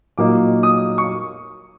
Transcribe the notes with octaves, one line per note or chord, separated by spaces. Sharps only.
A#2 F#3 A#3 D#4 D6
D#6
C#6